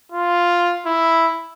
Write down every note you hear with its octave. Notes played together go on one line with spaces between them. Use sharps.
F4
E4